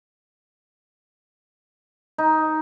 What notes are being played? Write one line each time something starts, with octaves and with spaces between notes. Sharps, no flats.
D#4